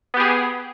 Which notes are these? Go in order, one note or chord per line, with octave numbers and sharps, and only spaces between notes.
B3 G4 G#4